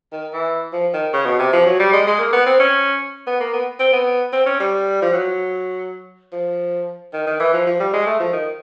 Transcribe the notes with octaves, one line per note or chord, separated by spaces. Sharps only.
D#3
E3
F3
D#3
C#3
B2
C3
F3
F#3
G3
G#3
G#3
A#3
B3
C4
C#4
B3
A#3
B3
C4
B3
C4
C#4
G3
F3
F#3
F3
D#3
D#3
E3
F3
F3
G3
G#3
A3
F3
D#3